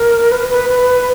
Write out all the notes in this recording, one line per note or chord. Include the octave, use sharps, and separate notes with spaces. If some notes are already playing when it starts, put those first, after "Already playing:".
Already playing: A#4
B4
B4
B4